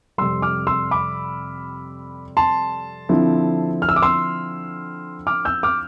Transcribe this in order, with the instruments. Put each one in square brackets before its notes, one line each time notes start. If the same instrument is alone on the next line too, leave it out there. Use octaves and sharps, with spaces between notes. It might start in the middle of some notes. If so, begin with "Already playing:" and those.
[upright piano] F2 C3 G3 C6 E6
D6 F6
C6 E6
B5 D6
A5 C6
D3 F3 C4 E4
F6
E6
D6
C6 E6
D6 F6
E6 G6
D6 F6